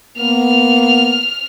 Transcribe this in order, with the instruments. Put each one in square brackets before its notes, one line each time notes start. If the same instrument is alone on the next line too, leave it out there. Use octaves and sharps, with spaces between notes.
[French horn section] A#3 B3 [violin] F6